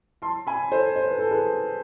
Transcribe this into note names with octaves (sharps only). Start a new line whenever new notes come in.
A5 C6
G#5 B5
A4 C5
C5
B4
A4
G#4 B4